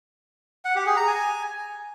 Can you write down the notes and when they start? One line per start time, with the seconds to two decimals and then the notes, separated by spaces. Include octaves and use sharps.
0.65 F#5
0.75 G4
0.86 G#4
0.97 A#5
1.07 G#5